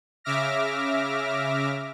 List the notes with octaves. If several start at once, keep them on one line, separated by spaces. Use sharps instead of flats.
C#3 E5 D6 F6 A#6